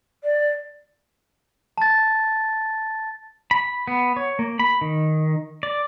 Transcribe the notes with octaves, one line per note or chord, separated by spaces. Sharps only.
D5
A5 A6
B5
B3
C#5
A#3
B5
D#3
D5